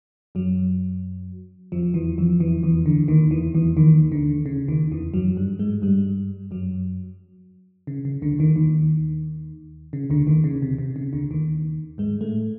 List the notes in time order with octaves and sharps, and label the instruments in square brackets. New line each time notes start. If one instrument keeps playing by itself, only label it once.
[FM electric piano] F#2 F#3
F2 F3
E2 E3
F2 F3
E2 E3
E2 E3
D2 D3
D#2 D#3
E2 E3
E2 E3
D#2 D#3
D2 D3
C#3
D#2 D#3
E2 E3
F#2 F#3
G2 G3
G#2 G#3
G2 G3
F#2 F#3
C#3
C#3
D2 D3
D#2 D#3
D#2 D#3
C#3
D2 D3
D#2 D#3
C#3
C3
C3
C#3
D2 D3
D#2 D#3
G#2 G#3
A2 A3